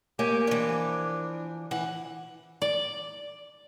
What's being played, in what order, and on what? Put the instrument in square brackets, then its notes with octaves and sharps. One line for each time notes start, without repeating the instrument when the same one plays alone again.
[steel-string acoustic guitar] A#3 [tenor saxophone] G4 [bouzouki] A#4 C#5 G#5
[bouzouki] E3 F3 [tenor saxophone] D4
[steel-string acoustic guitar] E3 [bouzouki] F#5
[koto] D5